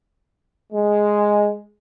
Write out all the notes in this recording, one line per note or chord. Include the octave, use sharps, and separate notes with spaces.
G#3